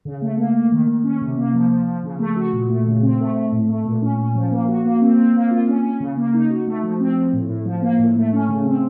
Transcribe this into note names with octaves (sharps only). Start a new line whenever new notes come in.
C#3
A3
A#3
A#3
D#3
D#3
C#4
C3
A#3
F3
F3
F3
C#3
A3
F#4
A#2
A3
C#3
C4
A3
A3
A2
A3
A#2
C#4
C#4
F3
A#3
F#4
A#3
C4
C4
A#3
F4
C#4
C#4
C#3
A#3
D#4
F#4
A3
F3
C4
F3
A2
A2
F3
A#3
A2
A3
C#4
C#3
C4